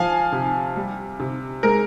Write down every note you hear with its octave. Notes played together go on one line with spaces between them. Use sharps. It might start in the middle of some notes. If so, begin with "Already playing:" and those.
Already playing: F3 F5 G#5
C3
G3
C3
G#3 A#4